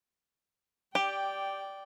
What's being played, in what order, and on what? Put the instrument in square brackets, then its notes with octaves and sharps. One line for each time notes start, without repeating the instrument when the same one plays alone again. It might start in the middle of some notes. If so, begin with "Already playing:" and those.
[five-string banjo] G4 [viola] D5 G5